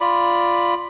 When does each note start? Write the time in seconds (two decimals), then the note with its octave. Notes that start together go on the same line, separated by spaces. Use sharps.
0.01 F4 D5 B5